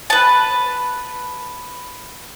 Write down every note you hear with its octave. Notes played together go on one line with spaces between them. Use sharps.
B4 A5